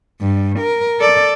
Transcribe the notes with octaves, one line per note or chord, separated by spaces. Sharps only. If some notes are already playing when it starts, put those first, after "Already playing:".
G2
A#4
A4 D5